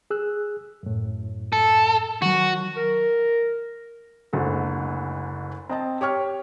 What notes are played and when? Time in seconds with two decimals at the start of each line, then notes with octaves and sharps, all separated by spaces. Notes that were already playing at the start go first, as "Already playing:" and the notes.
0.11 G#4 E6 F#6
0.83 F#2 A2
1.53 A4
2.22 D#3 F#3 F#4
2.77 A#4
4.33 F#1 D2 G#2 A4
5.69 C4 D#5 A5
6.01 G4 C#5 C#6 F6